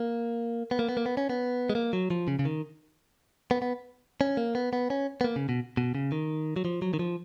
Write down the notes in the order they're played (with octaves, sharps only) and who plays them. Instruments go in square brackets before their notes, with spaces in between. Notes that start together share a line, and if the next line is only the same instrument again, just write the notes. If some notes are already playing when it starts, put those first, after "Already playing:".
Already playing: [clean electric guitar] A#3
B3
A#3
B3
A#3
B3
C#4
B3
G#3
A#3
F#3
F3
C#3
C#3
D#3
B3
B3
C#4
A#3
B3
B3
C#4
B3
A#3
C#3
B2
B2
C#3
D#3
F#3
F3
F#3
D#3
F3